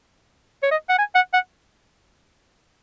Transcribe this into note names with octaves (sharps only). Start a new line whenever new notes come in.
C#5
D#5
F#5
G#5
F#5
F#5